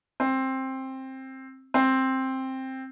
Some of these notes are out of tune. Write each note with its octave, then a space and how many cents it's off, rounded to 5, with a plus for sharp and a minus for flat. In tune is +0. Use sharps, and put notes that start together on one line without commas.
C4 +15
C4 +10